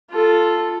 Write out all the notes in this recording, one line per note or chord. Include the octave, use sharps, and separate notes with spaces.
F4 A4